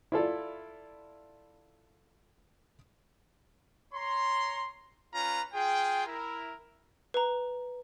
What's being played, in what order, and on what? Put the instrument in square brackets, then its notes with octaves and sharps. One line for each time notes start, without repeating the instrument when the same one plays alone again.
[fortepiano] E4 F4 A4 D5
[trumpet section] C#5 A#5 C6
C#4 F4 B4 A#5
F4 G#4 G5
E4 A#4
[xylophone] B4 A#5